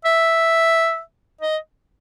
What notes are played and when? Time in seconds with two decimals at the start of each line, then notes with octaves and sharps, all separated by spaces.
0.05 E5
1.41 D#5